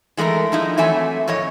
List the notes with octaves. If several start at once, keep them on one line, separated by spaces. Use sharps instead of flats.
E3 G#3 A3 D4 A#4
F3 D#4 E4
E3 F#3 A3 C4 E5 G#5
F2 A2 C#5 D#5